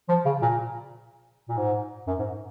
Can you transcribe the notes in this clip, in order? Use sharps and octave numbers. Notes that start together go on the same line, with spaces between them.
F3
C#3
A#2
A#2
G#2
F#2
G#2